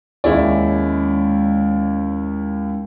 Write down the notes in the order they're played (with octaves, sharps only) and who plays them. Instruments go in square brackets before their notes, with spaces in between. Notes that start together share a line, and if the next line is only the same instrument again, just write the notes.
[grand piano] D#2 E4 D5 [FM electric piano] G#3 C#4